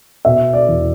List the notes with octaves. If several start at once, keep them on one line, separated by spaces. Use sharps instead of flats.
B2 E5
D5
E2